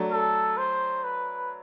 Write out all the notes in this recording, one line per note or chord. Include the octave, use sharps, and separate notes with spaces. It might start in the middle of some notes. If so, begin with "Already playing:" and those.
Already playing: F#3 A3 D4
A4
C5
B4